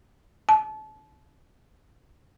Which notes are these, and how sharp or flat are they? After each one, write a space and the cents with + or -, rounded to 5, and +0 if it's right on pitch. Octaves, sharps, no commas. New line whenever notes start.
A5 -30